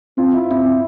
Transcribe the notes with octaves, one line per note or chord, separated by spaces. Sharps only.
C4 F4
E4
C4 E4